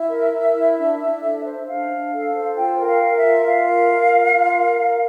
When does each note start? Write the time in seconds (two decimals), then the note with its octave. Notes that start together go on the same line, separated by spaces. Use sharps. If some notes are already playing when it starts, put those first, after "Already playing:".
Already playing: E4 E5
0.10 A#4
0.31 A#4
0.54 E4
0.77 D4
1.00 D4
1.21 A4
1.43 C5
1.66 D4 F5
1.88 D4
2.11 A4
2.33 C5
2.55 F4 G5
2.78 A#4
2.85 F5
3.01 A#4
3.15 E5
3.22 F4
3.45 F4 F5
3.68 A#4
3.90 A#4
4.13 F4
4.35 F4
4.57 A#4
4.79 A#4